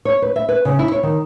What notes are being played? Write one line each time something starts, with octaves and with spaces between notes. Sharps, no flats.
C#5
B4
E5
B4
C#3
E4
C#5
D#3